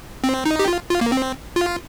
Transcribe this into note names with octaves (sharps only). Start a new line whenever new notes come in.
C4
D#4
G4
F4
F4
A#3
C4
F4